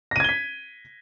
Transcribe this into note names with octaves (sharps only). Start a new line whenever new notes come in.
G#6 A#6 B6 D#7 G7